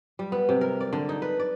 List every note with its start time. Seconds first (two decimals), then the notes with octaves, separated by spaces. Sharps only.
0.19 G3
0.32 B3
0.49 C3
0.61 A#4
0.81 D5
0.93 D3
1.09 D#4
1.22 B4
1.40 D5